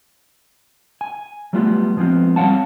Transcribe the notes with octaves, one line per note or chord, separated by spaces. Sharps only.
G#5
F#3 G3 A3 B3 F4
F3 G#3 B3 C4 F4
G3 C4 C#5 F5 F#5 A5